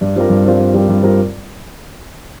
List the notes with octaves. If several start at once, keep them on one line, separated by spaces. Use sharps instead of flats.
G2
G3 C4 F4 A#4
G2
G3 C4 F4 A#4
G2
G3 C4 F4 A#4
G2
G3 C4 F4 A#4